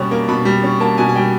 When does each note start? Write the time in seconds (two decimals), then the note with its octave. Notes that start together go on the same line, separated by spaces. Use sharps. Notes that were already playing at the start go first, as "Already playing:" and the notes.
Already playing: B2 G3 A#3 C#4
0.11 A#3
0.28 B2 B5
0.45 G3
0.64 C#4
0.80 A#3 A5
0.98 B2 G#5
1.09 G#5
1.15 G3 G5